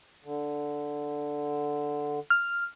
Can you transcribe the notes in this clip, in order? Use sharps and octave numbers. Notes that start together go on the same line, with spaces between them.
D3
F6